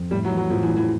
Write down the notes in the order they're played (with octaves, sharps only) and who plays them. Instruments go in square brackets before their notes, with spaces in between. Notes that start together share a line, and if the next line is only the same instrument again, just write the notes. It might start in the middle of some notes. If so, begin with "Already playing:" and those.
Already playing: [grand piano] F2
[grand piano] A2 [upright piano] G3
[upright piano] F#3
[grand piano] E3
[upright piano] F#3
[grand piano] A2 [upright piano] F3
[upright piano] E3
[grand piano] A2
[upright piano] E3